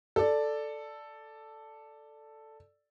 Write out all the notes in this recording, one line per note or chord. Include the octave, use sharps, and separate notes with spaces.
A4 D5